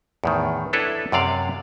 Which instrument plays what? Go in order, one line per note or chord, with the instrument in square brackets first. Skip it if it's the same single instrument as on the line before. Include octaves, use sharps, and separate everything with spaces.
[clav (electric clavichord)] E2 A2 D#3
D4 E4 A4 B4 C#5
F#2 C3 D5 F5